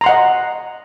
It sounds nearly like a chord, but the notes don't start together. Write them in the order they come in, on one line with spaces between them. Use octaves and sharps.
A#5 C6 F#5 D#5